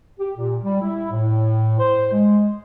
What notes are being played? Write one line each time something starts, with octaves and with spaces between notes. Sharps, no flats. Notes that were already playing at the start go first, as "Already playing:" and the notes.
G4
A#2
G3
E4
A2
C5
G#3